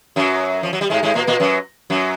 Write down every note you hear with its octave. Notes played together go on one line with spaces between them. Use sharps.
F#2 F#3
F3
F#3
G3
G#2 G#3
G#2 G#3
A#2 A#3
A#2 A#3
F#2 F#3
F#2 F#3